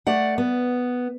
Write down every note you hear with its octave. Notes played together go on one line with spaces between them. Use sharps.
A3 D5 F#5
B3